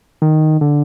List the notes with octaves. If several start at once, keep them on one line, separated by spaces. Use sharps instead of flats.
D#3
D3